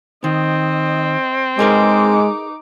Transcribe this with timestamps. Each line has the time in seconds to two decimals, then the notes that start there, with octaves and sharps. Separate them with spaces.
0.24 D#3 C4 D#5
1.59 G#3 D#4 G#4 A#4 B4 D6